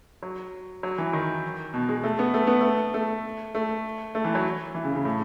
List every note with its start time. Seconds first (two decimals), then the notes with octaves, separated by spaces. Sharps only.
0.23 F#3
0.83 F#3
0.98 E3
1.13 D#3
1.74 B2
1.89 G#3
2.04 A3
2.19 B3
2.34 A3
2.47 B3
2.61 A3
2.94 A3
3.55 A3
4.15 A3
4.25 E3
4.35 F#3
4.75 E3
4.85 C#3
4.95 C#3
5.05 A2